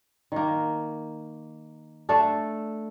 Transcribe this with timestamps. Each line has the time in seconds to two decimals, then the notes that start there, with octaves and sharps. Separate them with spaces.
0.32 D#3 A#3
2.09 A3 D4 A4